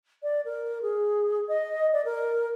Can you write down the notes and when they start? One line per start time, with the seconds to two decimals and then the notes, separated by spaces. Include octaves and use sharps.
0.23 D5
0.45 A#4
0.82 G#4
1.48 D#5
1.93 D5
2.05 A#4